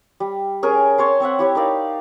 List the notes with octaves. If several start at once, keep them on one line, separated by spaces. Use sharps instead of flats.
G3
C#4 G#4 A#4
C#5 A5 C6
C4 C#5 E5 F#5
E4 G4 C#5
D#4 A#4 D5 F5